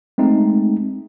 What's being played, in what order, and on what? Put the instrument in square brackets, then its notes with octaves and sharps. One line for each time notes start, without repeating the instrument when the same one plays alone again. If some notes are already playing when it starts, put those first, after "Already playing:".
[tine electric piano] G#3 A3 C4 D#4